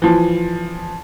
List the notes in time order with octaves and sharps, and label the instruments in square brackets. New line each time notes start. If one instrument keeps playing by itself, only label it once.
[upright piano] E3 F3